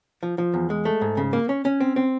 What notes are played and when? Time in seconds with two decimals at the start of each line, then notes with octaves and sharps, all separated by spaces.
0.23 F3
0.38 F3
0.54 E2
0.70 G#3
0.85 A3
1.01 G#2
1.17 C#3
1.33 A#3
1.49 C#4
1.65 C#4
1.80 C4
1.96 C4